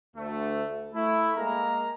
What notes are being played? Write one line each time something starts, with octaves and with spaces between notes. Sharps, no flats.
D2 A3
A3 E4
G#3 A#3 G#4 F5 A#5